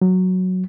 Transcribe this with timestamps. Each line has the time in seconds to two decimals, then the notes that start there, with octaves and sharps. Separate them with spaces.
0.02 F#3